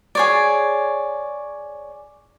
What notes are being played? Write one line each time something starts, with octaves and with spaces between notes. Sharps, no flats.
G#4 C#5 D5